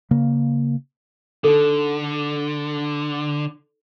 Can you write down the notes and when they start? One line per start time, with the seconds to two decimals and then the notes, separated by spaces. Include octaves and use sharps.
0.11 C#3 A#3
1.44 D3 D#4 A4